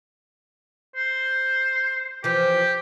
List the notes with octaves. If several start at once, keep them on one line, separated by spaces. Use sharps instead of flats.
C5
E3 F3 G4